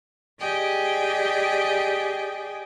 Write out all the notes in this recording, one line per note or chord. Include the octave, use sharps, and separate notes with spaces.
G4 G#4 D5 D#5 G5 G#5